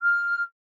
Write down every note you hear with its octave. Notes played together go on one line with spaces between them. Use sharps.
F6